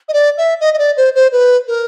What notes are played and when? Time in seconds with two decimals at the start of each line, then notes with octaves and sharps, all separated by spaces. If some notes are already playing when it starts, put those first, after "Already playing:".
0.08 D#5
0.13 D5
0.37 E5
0.60 D#5
0.74 D#5
0.78 D5
0.97 C5
1.15 C5
1.32 B4
1.67 A#4